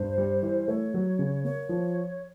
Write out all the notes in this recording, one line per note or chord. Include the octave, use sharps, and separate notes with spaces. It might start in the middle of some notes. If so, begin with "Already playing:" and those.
Already playing: G2 C5
G3
E3
A3 C#5
F#3
C#3
A#3 C#5
F3